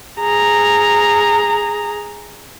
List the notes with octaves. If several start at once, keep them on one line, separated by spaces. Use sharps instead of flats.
G#4 A#5